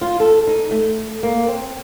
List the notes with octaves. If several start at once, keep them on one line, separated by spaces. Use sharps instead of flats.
F4
A4
D#4
A3
A#3
C4